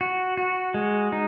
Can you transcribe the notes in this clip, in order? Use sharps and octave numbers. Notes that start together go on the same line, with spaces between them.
F#4
F#4
G#3
D#4